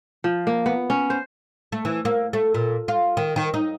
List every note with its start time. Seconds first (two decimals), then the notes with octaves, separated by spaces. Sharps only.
0.24 F3
0.47 A#3
0.66 B3
0.90 C#4
1.10 C5
1.72 A3
1.85 E3
2.05 A#3
2.33 A3
2.54 A#2
2.88 F4
3.17 D#3
3.36 D#3
3.54 D#4